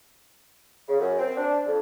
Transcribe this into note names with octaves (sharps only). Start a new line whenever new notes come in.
C#3
F#2
C4
D4
F2